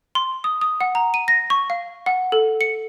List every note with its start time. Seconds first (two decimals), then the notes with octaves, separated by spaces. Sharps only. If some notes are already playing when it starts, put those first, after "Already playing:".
0.15 C6
0.44 D#6
0.61 D#6
0.81 F#5
0.95 A#5
1.14 D#7
1.28 A#6
1.50 C#6
1.70 F5
2.06 F#5
2.32 A4
2.61 C#7